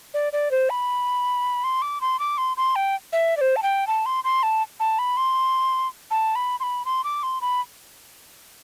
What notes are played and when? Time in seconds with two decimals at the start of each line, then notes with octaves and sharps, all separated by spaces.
0.14 D5
0.33 D5
0.51 C5
0.70 B5
1.64 C6
1.82 D6
2.01 C6
2.19 D6
2.38 C6
2.57 C6
2.76 G5
3.13 E5
3.37 D5
3.41 C5
3.56 A5
3.63 G5
3.87 A5
4.06 C6
4.24 C6
4.43 A5
4.80 A5
4.99 B5
5.17 C6
6.11 A5
6.35 B5
6.60 C6
6.63 B5
6.85 C6
7.04 D6
7.23 C6
7.41 B5